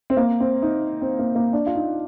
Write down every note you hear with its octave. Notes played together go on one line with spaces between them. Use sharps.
C4
A#3
C4
D#4
C4
A#3
A#3
D4
F4
D#4